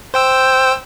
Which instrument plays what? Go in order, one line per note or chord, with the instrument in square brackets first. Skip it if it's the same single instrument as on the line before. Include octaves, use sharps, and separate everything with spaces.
[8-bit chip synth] C5 G5 E6